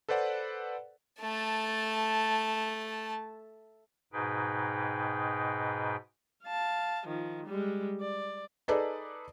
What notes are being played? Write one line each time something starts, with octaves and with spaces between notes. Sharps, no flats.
A4 B4 C5 D5 F#5
A3 A5
G#2 B2 D#4 G#4 B4 G5
F5 A5
D#3 F3
G3 G#3
D5
D#4 G#4 A4 B4 D5